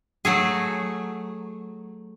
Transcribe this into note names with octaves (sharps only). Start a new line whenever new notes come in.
F#3 A3 G#4